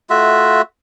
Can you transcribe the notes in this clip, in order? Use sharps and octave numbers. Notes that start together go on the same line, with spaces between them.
A3 F4 F#4 E5